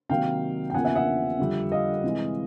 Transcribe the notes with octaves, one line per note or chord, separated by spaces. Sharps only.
C3 D#3 F#3 A#3 F5 G5
G5
E2 C#3 F3 A#3 F#5 G#5
E5 F#5
E5 F#5
F2 D3 G3
D#5 F5
C3 E3 G#3